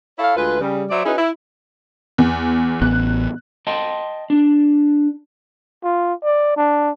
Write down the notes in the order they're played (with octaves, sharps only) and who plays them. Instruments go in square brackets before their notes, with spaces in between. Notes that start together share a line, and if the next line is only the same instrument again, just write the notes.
[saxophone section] E4 A4 C#5 E5 F5
D2 G#3 F4 B4
C#3 G3
F#3 C5 D5 E5
C#4 D#4 E4 F#4 G#4 B4
E4
[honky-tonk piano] E2
[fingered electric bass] A1 B3 [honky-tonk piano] F#6
[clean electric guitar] D#5 G5 A5 C6
D4
[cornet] F4
D5
D4